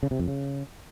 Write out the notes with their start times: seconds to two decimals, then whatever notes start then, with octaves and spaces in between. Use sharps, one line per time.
0.03 C#3
0.11 C3
0.19 F2
0.28 C#3